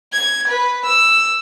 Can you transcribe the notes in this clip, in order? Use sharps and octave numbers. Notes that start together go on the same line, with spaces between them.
G#6
B4
E6